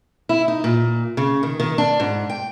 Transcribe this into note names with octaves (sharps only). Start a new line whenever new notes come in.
E4
D#4
A#2
C#3
D#3
D#3
D4
G#2
G5